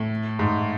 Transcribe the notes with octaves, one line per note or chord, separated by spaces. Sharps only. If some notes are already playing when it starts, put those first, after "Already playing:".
Already playing: A2
G#2